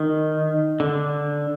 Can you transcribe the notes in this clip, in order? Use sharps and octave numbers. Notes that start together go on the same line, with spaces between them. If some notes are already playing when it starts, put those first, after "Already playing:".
Already playing: D#3
D3